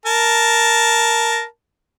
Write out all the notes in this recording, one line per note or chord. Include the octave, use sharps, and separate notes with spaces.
A#4 A5